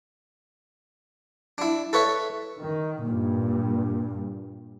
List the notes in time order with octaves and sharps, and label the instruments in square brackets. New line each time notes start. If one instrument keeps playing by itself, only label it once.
[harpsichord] D4 E4
A4 B4 C#5 E5
[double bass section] D#3
G2 A#2